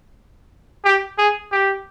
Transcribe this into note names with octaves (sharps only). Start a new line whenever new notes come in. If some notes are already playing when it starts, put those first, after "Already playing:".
G4
G#4
G4